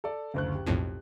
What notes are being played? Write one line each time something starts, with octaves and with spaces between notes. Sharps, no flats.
A4 D5
F#1 D2 F#6
G4
B1 F2 A2